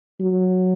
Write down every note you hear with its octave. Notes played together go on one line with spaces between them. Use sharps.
F#3